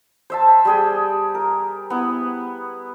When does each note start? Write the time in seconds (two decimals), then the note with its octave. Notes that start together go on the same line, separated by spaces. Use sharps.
0.30 C5 E5 A5
0.65 G3 G#4 G5
1.35 A#4
1.90 B3 E4